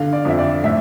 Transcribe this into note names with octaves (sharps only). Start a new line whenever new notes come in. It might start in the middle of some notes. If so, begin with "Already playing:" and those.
Already playing: D3 F5
D5
F2 E5
D5
A2 E5